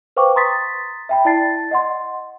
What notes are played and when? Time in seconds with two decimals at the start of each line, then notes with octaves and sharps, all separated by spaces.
0.17 B4 C5 F5 G5 C#6 D6
0.36 A#5 C6 D#6 A6 B6
1.09 E5 G5 B5
1.25 E4 D5 A5 A6 C7
1.71 D#5 F#5 C6